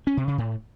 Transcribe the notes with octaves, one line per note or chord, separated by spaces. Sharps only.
C#4
C3
C#3
A2